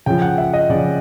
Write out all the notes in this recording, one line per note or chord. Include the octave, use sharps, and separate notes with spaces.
C#3 F3 G5
F#5
E5
D#5
C#3 F3 D5